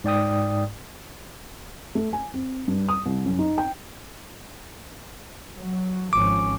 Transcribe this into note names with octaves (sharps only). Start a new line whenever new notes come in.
G#2 D5 G5 D#6
A3
G#5
C4
G2
D#6
C2
F#2
D#4
G5
F#3
G#1 F3 C#4 D6